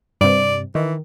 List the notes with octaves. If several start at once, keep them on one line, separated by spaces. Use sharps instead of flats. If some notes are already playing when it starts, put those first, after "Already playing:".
G2 C3 D5
D#3 E3